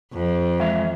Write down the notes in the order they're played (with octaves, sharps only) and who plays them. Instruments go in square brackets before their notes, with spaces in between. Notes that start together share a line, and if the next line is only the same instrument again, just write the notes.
[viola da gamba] F2
[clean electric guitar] E3 G#3 F5 [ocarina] E5